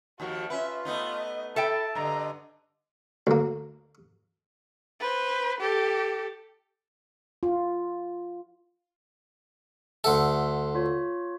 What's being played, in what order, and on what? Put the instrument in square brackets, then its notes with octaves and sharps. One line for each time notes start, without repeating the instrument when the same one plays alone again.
[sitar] D#2 D#3 F3 [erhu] F#4
[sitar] C#4 B4 [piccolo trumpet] F4 [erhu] E5
[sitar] A3 B3 D#4 [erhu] D#5
[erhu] E4 [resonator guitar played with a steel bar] A4 E5 G5 [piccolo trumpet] A5
[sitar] G2 D3 [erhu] D#5 [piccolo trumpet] A#5
[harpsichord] D2 A#3
[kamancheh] B4 C5
G4 A4
[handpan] F4
[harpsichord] D2 A4 [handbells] E5 F#5 C6
[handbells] F4 C#5